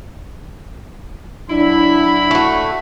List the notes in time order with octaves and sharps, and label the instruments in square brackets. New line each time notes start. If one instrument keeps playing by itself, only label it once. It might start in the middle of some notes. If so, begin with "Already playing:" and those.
[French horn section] F#3 D4 [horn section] E4 [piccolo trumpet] B5
[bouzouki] A3 F#4